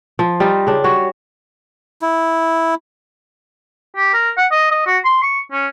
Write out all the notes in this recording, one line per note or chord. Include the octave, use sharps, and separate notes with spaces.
F3
G3 D#4 F4
C#3 D4
G3 F#4 C#5
E4
G4
A#4
F#5
D#5
D#5
F#4
C6
C#6
C#4